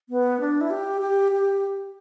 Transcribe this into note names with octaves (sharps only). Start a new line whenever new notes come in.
B3
D4
E4
G4
G4
G4